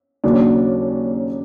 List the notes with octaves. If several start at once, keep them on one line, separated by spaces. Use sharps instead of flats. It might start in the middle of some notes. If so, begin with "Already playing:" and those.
D#2 C#3 F#3 A#3 D4